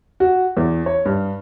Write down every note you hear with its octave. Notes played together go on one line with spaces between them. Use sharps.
F#4
E2
C#5
G2